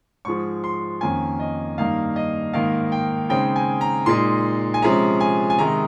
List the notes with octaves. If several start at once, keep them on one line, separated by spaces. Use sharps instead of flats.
G#2 F3 G#3 C#6
C6
F2 D#3 A#3 C#4 G#5
D#5
G2 D#3 A#3 D#4 F5
D#5
G#2 D#3 A#3 D#4 F5
G5
C#3 G#3 C4 D#4 G5
G#5
A#5
A#2 G#3 D#4 C6
G#5
C3 F3 G#3 C#4 A#5
G#5
G#5
C3 D#3 G#3 D#4 A#5